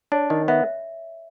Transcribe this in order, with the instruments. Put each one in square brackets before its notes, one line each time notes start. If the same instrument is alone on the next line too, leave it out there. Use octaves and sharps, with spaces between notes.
[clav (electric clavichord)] D4 [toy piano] C#5
[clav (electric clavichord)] D#3 [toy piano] D#5
[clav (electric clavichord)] B3 [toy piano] E5